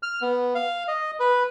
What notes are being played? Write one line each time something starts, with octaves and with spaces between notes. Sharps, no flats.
F6
B3
F5
D#5
B4